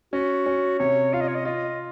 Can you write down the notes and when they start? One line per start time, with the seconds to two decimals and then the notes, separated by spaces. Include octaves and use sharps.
0.13 C#4 F#4
0.46 C#4
0.79 C3 C#5
1.13 F4 F5
1.21 D#5
1.28 C#5
1.35 D#5
1.45 F4 D#5